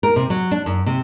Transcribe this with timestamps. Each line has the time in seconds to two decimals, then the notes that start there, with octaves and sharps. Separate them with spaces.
0.03 A#4
0.16 C3
0.30 F#3
0.51 D4
0.66 F#2
0.86 C3